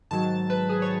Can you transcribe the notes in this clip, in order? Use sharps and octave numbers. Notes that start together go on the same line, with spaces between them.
G#2 D#3 F#3 A5
B4
G#4
C#5